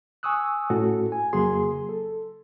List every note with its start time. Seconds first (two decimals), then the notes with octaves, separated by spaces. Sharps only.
0.23 G#5 C#6 D#6 E6 F#6
0.70 A2 C#4 F#4 A4
1.12 G#5
1.33 F2 C#3 F#3 A#3 G#4 C6
1.89 A4